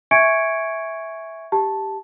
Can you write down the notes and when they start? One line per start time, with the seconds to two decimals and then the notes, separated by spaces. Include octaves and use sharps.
0.11 E5 G#5 C#6 G#6 C#7 D7
1.52 G4 A5